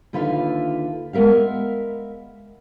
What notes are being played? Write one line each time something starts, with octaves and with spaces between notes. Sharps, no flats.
D#2 D3 F4 B4 E5 F5
G#3 B3 A#4 E5 F5